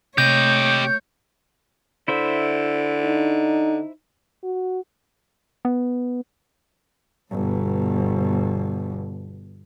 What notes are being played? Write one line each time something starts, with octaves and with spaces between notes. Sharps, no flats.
C3 A3 G4 C#5 D#5 G6
D3 E4 C5 E5
D#4
F#4
B3
G1 B2